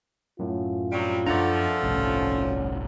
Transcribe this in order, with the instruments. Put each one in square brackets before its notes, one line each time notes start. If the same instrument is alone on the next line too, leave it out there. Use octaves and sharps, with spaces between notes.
[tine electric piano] F#2 A2 [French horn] F4
[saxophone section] C3 F#3 G3
[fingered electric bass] F#2 D4 [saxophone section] F3 A3 [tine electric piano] D5 F#5 A#5
[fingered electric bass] G1 C2 A2 [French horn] C#4